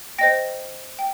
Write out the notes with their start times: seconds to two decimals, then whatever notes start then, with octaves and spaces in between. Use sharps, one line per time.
0.19 C5 D#5 G5 A#6
0.99 G5